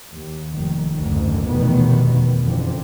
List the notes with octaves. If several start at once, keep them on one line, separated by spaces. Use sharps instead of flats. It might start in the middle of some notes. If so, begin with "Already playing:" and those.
D#2
F1 D#3
F#1 D2 G#2 D3 D#3
F1 E2 B2 D#3 B3
F#1 F2 D3 E3 C4